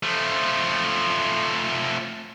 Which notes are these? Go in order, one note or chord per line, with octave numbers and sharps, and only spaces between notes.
F3 A3